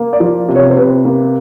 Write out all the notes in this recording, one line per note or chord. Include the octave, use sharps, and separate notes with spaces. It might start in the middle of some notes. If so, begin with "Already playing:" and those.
Already playing: A#3
D5
F3
C3
C#5
C5
C3 B4
A#3